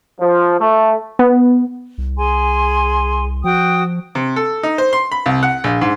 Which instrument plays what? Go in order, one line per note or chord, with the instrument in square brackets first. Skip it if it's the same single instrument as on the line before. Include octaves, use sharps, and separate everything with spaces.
[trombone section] F3
A3
[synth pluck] B3
[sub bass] C2
[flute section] G#4 G#5 C6
[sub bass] F3 [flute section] F#4 G5 D#6
[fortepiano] C3
A4
D#4
C5
C6
B5
C2
F#5
A#1
G#2